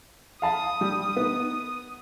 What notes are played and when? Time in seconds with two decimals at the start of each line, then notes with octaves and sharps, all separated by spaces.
0.42 F5 A5 B5 D#6
0.81 G3
1.17 B3 D#4